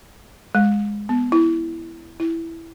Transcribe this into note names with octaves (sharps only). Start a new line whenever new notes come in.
G#3
B3
E4
E4